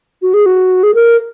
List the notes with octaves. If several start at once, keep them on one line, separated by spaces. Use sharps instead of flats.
F#4
G#4
F#4
G#4
A#4